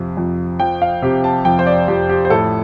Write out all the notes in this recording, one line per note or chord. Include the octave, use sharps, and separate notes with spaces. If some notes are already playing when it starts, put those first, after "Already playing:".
Already playing: F2 C3 F3
F2
F3 G5
F5
C3 G4
A5
F2 G5
C5
D5
F2 G4
G4
C5
A2 A4